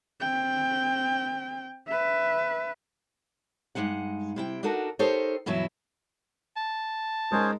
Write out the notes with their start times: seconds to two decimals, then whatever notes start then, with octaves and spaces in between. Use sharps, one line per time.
0.20 C4 G5
1.88 B4 E5
3.75 G2 D#3 G#3 D#4 F#5
4.36 C3 E4 G5
4.63 D4 D#4 F#4 A4 A#4
4.99 D#4 G4 A4 A#4 C5 C#5
5.46 G2 B2 E3 F#3 E4
6.57 A5
7.32 G#3 C#4 D#4 G#4 A#4 C5